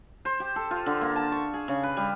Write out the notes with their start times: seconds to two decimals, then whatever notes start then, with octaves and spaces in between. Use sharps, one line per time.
0.25 C5
0.40 G4
0.56 A4
0.71 F4
0.86 D3
1.01 A#3
1.16 A5
1.32 C#6
1.54 G#4
1.68 C#3
1.83 B4
1.97 G3